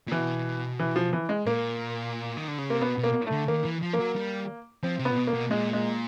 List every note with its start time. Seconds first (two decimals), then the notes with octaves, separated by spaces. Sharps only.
0.08 A#2
0.12 B2 E3
0.80 E3
0.96 F3
1.13 E3
1.29 G#3
1.47 A#2 A#3
2.37 D#3
2.48 D3
2.58 C#3
2.70 C3 A#3
2.81 B2 B3
2.98 B2
3.03 A#3
3.26 A3
3.32 D3
3.48 D#3 A#3
3.65 E3
3.82 F3
3.93 A#3
3.99 F#3
4.16 G3
4.83 F3 C4
4.99 C3
5.05 B3
5.10 A#2
5.17 B2
5.27 A#3
5.33 B2
5.50 A#2 G#3
5.73 G#3